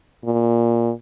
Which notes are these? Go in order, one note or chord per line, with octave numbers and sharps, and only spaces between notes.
A#2